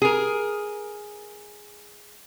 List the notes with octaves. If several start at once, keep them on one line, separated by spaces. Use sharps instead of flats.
G#4 A#4